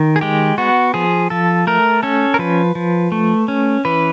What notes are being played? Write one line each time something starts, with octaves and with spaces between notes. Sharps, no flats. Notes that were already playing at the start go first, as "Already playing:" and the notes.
Already playing: D#3
G#4
G#3 G4
B3 F#4
F3 G#4
F3 A4
A3 A#4
C#4 A4
A#4
F3 B4
F3
A3
C#4
E3 B4